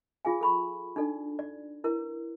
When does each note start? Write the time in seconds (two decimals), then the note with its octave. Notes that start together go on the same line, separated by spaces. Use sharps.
0.25 F4 G#4 F5 G#5
0.41 A4 B5 C#6
0.96 D4 D#4 A4 D5
1.39 D5
1.84 E4 A#4 B4